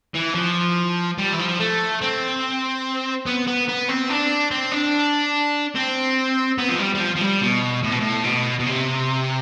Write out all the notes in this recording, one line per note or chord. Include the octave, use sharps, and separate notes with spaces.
E3
F3
G3
E3
F3
A3
C4
B3
B3
B3
C4
D4
C4
D4
C4
B3
F3
G3
G3
F3
F3
G3
B2
A2
B2
A2
B2
B2
C3